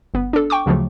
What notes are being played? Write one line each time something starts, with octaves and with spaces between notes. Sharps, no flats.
G1 B3
D4 A4
G5 C#6 D6
D2 C#3 F3 F#3 A3